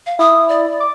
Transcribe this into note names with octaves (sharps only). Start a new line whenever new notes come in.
F5
E4 D#6
D5
D6